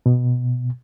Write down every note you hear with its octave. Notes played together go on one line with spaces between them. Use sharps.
B2